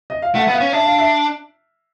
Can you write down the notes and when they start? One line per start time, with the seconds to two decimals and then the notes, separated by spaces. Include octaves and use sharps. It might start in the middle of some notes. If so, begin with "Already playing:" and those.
0.10 D#5
0.22 F5
0.35 A3 F#5
0.48 B3
0.53 F5
0.60 C#4
0.73 D4 E5
0.85 F5
0.99 E5